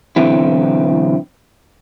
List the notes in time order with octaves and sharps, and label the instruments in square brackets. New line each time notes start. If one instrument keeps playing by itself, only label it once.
[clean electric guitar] B1 D3 E3 C4 E4